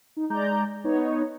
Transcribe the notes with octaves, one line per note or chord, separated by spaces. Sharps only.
D#4
G#3 D5 A#5 G6
B3 D#4 C#5